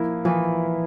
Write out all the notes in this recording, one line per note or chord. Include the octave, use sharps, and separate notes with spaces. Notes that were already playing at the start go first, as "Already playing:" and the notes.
Already playing: F3 A#3 E4
E3 F3